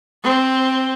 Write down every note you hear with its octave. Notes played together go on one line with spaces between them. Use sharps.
C4